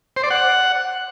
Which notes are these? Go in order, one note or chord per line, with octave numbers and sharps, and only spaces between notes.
C5
D5
F#5